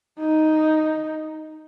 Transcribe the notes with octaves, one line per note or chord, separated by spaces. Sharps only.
D#4